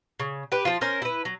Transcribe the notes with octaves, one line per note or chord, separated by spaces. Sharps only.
C#3
G4 B4
F3 F4
C#4 A#4 C5
E4 B4
F#3